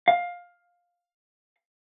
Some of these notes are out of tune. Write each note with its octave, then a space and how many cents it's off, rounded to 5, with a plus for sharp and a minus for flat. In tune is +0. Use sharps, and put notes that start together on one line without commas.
F5 +15